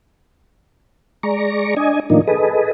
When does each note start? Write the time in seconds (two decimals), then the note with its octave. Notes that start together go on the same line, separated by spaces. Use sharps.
1.23 G#3 D5 A#5 C#6
1.77 D4 D#5 G#5
2.10 A2 D#3 F3 A#3 D4 D#4
2.27 G#4 A4 B4 D#5